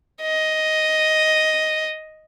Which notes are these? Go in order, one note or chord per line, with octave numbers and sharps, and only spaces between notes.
D#5